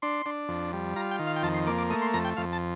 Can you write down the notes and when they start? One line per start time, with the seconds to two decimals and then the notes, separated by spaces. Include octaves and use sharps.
0.02 D4 C6
0.26 D4
0.49 F2
0.73 G3
0.96 F4 A#5
1.11 G5
1.19 D#3
1.27 F5
1.36 G5
1.43 F2 A5
1.54 C6
1.67 A#3 D6
1.78 D6
1.90 A3 D#6
2.02 C6
2.14 F2 A#5
2.25 G5
2.37 F2 F5
2.53 A5